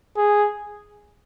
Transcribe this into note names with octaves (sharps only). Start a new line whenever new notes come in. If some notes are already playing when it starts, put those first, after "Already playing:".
G#4